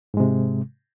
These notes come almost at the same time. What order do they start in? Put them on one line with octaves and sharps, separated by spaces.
G#2 G#3 C3